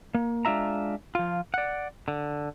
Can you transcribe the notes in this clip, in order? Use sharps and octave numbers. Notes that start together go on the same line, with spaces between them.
A#3
G#3 D4 F4 E5 A#5
F3 F4
D5 F#5
D3